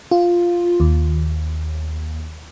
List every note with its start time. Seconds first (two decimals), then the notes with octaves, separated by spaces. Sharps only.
0.11 F4
0.80 D#2